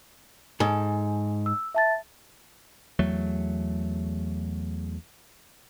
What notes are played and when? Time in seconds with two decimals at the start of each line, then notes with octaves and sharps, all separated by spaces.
0.60 G#2 A4 G#5
1.46 E6
1.75 E5 A5 A6
2.99 E2 F#3 A3